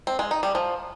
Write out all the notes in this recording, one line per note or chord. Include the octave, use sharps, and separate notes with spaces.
C4
G#3
D#4
G3
F3